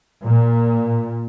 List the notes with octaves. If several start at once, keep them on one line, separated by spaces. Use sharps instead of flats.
A#2